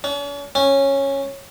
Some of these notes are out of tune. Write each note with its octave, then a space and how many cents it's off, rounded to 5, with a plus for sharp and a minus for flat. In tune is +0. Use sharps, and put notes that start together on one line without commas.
C#4 +45
C#4 -10